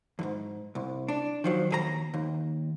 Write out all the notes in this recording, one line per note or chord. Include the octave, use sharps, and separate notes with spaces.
E2 G#2
C2
D4
D#3 F3 F#3
D#2 G#4 A#5
D#2